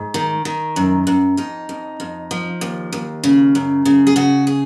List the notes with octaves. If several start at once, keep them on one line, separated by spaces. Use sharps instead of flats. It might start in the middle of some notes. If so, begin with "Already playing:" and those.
Already playing: G#2
D#3
D#3
F#2
F#2
F2 D#4
F2
F2
F3
D#2
D#2
C#3
F#2
C#3
G#4
C#3 F#4
G#4